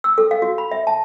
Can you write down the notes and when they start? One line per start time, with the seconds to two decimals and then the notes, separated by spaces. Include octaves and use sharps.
0.04 E6
0.18 A4
0.31 F5
0.42 F#4
0.58 B5
0.72 E5
0.87 A5